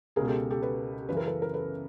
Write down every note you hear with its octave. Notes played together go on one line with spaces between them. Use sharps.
C#2 G#4 A#4
B2
G4 A4
G4 A4
A4 B4
F#2 C#3 E3 B4
A#4
A4 B4
A#4
A4 B4